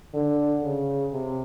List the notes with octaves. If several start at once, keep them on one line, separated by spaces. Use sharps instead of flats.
D3
C#3
C3